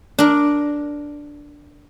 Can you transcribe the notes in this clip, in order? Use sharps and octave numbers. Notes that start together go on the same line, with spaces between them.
D4 A#4